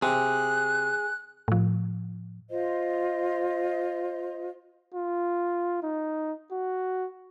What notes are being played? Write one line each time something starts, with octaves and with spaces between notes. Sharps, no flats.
C3 G#4 F#6
A2 F3
F4 C5 D#5
F4
D#4
F#4